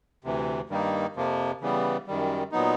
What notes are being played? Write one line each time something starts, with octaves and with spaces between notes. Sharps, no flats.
D2 C3 E3
G2 D#3 G3 A#3 D#4
F2 C3 F3 A#3
C#3 E3 G3 B3
F#2 D#3 G3
A#2 F#3 B3 D#4